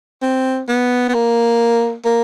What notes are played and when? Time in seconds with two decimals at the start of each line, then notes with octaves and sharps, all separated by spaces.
0.22 C4
0.68 B3
1.09 B3
1.14 A#3
2.05 A#3